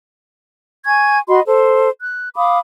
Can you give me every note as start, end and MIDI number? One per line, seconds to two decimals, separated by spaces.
0.85 1.18 80
0.85 1.18 85
0.85 1.18 92
1.28 1.40 66
1.28 1.40 75
1.28 1.40 83
1.28 1.40 84
1.46 1.89 69
1.46 1.89 72
2.02 2.29 90
2.35 2.58 77
2.35 2.58 83
2.35 2.58 86
2.35 2.58 87